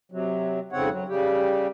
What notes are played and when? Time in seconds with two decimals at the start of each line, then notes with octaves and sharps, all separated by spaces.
0.12 C3 F#3
0.72 F2 G#2 C#3 C4 C#5 F#5
0.90 F#3
1.09 C#3 G3 G4